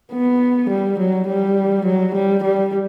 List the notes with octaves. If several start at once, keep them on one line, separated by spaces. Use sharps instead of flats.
B3
G3
F#3
G3
F#3
G3
G3